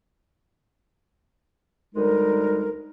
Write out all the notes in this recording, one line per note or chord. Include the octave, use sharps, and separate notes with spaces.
D2 G3 G#3 D#4 A#4